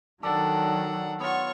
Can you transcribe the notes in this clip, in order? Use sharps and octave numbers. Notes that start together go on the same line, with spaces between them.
D#3 F#3 D4 A4 D5 F#5
B3 F4 C#5 C#6